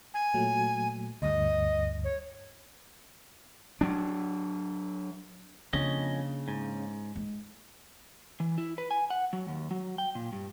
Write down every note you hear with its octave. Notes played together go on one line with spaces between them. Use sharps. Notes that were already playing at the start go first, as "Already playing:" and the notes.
G#5
A#2 F#3 A3
D2 G2 D#5
C#5
F#3 D4
F2 C#3 A#3 C#4 D4 D#5
G#2
G#3
E3
E4
B4
G#5
F#5
F#3
D#2
F#3
G5
A#2
G2